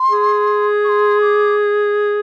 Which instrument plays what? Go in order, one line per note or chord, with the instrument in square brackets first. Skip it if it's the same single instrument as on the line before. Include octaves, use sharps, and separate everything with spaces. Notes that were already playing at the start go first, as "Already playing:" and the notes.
Already playing: [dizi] C6
[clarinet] G#4
[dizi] C#6
C6
D6